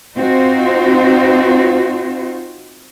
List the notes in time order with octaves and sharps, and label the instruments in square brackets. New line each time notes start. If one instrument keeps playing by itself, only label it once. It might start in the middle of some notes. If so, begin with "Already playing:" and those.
[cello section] C4 D#4 F4 F#4 C5